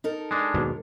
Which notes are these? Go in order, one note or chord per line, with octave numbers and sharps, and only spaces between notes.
D#4 A4 A#4
G#3 D4
D#2 G#2 B2